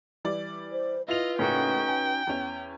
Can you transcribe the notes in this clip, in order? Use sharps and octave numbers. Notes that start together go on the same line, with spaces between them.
E3 G3 D5
C5
E4 F4 B4 D#5 F7
A2 C#3 A#3 C#4 D#4 F#4 G5
G#5
E2 C#4